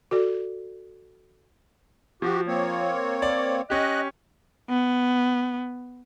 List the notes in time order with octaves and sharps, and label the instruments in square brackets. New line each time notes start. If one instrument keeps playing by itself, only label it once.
[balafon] F#4 A4 D5
[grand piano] F3 [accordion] F#4 G4
[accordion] A#3 C4 C#5
[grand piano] D5
[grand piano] C#4 G4 [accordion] D#5 F#6
[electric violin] B3